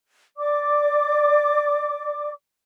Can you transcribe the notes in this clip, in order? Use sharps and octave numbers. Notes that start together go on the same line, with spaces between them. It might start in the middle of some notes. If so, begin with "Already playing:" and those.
D5 D6